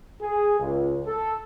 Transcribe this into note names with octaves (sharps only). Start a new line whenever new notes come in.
G#4
C#2
A4